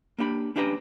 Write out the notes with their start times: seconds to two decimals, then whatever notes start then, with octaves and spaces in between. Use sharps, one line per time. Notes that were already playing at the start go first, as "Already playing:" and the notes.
0.18 A#3 D4 G4 B5
0.56 C#4 D4 E4 G4 B4 A#5